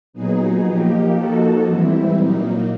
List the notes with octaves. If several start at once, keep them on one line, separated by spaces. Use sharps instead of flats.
A#2 F#3 B3 D#4 G#4
F3 A#3 D#4 G4
F3 A#3 D#4 F#4 A4
G#2 E3 G3 C4 E4
A#2 F#3 A#3 D#4